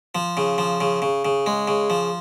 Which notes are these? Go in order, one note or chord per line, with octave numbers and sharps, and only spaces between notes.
F3
C#3
F3
C#3
C#3
C#3
G#3
C#3
F3